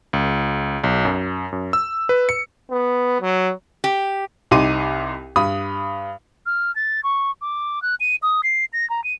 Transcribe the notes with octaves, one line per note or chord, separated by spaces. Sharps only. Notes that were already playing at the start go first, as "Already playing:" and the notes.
C#2
B1
F#2
F#2
E6
B4
C#7
B3
F#3
G4
C2 C3 D#4 C6 D6 D#7
G2 B5 D#6
F6
A6
C#6
D6
F#6
D#7
D#6
C7
A#6
A#5
D#7